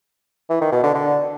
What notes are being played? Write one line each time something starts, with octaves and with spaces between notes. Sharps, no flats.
E3
D#3
B2
D3
D3